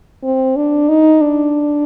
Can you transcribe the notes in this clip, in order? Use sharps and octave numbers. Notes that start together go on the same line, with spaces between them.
C4
D4
D#4
D4